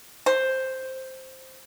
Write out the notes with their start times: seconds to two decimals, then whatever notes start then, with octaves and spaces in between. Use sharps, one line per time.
0.26 C5